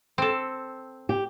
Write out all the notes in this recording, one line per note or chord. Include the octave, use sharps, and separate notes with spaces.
C4 A4
G4